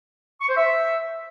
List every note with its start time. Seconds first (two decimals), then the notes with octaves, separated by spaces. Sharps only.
0.41 C#6
0.49 C5
0.56 E5